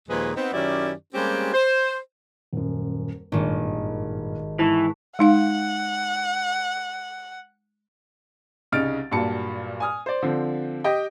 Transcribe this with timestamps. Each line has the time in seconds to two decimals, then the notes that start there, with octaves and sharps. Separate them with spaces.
0.09 D#2 A#2 F3 G#3 G#4 B4
0.35 B3 C4 D#4
0.53 F#2 D#3 C#4 E4 G4 D5
1.14 G3 G#3 A#3 C4 C#4 G4
1.53 C5
2.53 D#1 F#2
3.32 G#1 G2 A#2 D#3 G4
4.59 G#2 E3 A5 C#6
5.19 G#3 D#4 F5 F#5
8.72 C2 C#3 D#4 F6 A6 D7
9.11 G2 A#2 F#3 A5 C#7
9.80 G#5 D#6 F6
10.06 C5 D5
10.22 D3 F3 C4
10.84 G4 D#5 G5